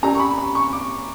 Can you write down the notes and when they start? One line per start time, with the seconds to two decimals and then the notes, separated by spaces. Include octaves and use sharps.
0.03 C#4 G4 A#4 D5 A#5
0.15 C#6
0.19 B5
0.38 B5
0.55 C#6
0.73 D6